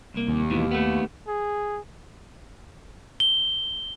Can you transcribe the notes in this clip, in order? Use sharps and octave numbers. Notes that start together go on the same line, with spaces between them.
C2 A#3
D#2
G#2 B2 E3
A3 B3
G#4
G7